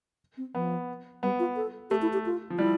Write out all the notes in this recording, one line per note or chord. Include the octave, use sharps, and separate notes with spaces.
C4
F3 B3
G3 B3
F4
A4
A3 G4
E4
G4
F4
F3
G3 E4